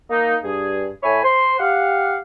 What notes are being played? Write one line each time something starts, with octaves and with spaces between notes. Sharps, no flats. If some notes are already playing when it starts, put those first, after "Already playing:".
A#3 D#4
G2 G#4
A2 C#5 E5 G#5 B5
C5 C6
G4 F5 F#5